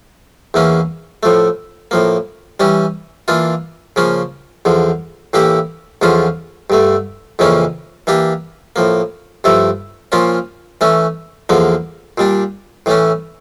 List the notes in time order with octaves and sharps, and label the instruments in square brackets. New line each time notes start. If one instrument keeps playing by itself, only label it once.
[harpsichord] E2 E3 A#3 C#4
A2 F3 A3
A2 F3 A#3
E3 G3 C#4
E3 A#3 D4 F4
C#3 F3 A#3 C#4
E2 D3 F3
A2 E3 A#3 E4 G4
E2 D3 F3 C#4 F4
G2 D3 A3
F2 C#3 E3 A#3 C#4
E3 A#3 D4 G4
A2 F3 A#3
G2 F3 A3 E4
A#2 F3 A#3 C#4 F4
E3 A3 C#4
E2 D3 F3 A#3
A#2 G3 D4
A2 E3 A3 C#4